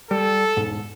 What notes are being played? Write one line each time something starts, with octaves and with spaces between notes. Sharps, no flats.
G3 A4
E1 G#2